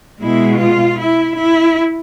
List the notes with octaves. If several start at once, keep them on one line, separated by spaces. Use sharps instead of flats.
B2 G#3 E4
F4
E4
E4